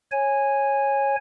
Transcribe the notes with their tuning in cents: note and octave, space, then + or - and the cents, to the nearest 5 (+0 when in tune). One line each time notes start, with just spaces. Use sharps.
C#5 -15 G#5 -5